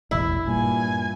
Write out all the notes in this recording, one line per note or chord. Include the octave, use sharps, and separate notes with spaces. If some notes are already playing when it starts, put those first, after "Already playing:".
E1 A1 E4
G2 A#2 G#5